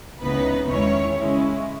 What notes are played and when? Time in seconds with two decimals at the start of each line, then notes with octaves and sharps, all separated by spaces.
0.20 C#2 C#3 E3 B3 D#4 B4
0.68 E2 D#3 G#3 C#4 E4 C#5
1.17 C#3 G#3 C#4 E4